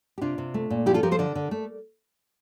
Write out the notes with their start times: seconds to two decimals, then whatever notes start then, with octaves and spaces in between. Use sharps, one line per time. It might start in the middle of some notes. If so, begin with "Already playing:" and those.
0.18 G4
0.21 C3 D4 F4
0.38 C3
0.54 A3
0.70 A#2
0.86 F3 E4 G4
0.94 F4 A4
1.03 F3 G4 A#4
1.11 A4 C5
1.19 D3 A#4 D5
1.35 D3
1.51 A3